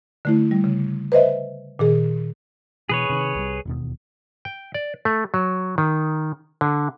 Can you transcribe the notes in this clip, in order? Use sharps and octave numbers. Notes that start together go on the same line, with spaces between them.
D3 A3 E4
G3
C#3
B4 C5 D#5 E5
A#2 D#3 G#4
B2 E3 G#4 B4 C#5
C3 D#3
C2 F#3 G3
E1 D#2 B2
G5
D5
A3
F#3
D#3
D3